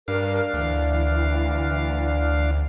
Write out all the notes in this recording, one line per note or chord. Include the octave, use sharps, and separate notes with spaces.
G2 D4 A#4 F5
D2 E3